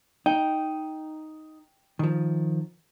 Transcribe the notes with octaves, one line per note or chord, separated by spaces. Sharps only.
D#4 G5
D#3 F3